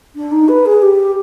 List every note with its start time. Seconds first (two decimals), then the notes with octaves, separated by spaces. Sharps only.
0.16 D4
0.31 D#4
0.49 B4
0.66 G#4
0.82 G4